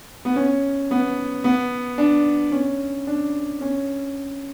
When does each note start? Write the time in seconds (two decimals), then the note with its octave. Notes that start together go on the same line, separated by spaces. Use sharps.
0.25 B3
0.36 C#4
0.91 B3
1.44 B3
1.98 D4
2.52 C#4
3.07 D4
3.61 C#4